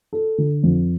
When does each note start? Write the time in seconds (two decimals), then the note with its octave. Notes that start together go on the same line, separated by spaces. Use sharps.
0.13 A4
0.38 D3
0.63 F2